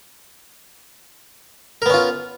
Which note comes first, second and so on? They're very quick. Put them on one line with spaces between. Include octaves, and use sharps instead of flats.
A#4 B3 C#4 F4